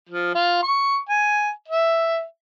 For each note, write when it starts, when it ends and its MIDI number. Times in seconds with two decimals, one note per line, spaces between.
0.09 0.32 53
0.35 0.63 65
0.63 0.97 85
1.09 1.50 80
1.68 2.24 76